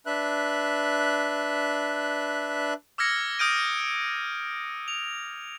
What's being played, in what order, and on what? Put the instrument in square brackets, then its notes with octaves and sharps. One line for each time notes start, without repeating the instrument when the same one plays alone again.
[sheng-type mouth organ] D4 B4 E5 F#6
[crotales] D6 E6 F6 G#6 A#6 C#7
D#6 F6 G6 D7 D#7
F7